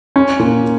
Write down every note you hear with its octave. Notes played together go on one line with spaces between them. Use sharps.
C#4
A#2